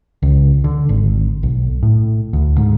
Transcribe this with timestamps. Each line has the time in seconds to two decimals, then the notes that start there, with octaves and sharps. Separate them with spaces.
0.23 C#2
0.64 D3
0.89 G#1
1.43 B1
1.83 A2
2.33 D2
2.58 G#2